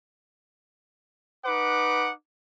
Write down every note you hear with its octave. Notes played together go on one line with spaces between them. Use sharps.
D#4 B4 F#5 D6